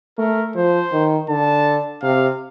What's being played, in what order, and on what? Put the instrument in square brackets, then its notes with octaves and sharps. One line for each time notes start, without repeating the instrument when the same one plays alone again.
[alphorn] A3 [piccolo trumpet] A#4
[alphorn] F3 [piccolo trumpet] C5
[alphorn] D#3
[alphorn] D3 [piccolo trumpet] A5
[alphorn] C3 [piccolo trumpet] F5